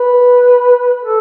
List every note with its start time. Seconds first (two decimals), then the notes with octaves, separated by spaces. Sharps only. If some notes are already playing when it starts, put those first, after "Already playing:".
Already playing: B4
1.02 A4